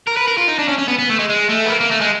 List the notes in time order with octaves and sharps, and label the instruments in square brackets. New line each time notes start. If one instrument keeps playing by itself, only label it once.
[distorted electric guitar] A#4
B4
A#4
F4
D#4
D4
C#4
C#4
B3
B3
A3
G#3
G#3
A3
B3
A#3
A#3
A3
G#3